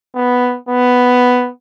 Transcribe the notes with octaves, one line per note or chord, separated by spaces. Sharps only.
B3
B3